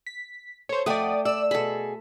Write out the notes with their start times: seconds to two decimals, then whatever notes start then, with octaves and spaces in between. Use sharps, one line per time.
0.07 B6
0.69 A4 C5 C#5
0.86 F2 A3 D5 F#5 G5 D#6
1.25 D5 E6
1.51 B2 G#4 A4 B5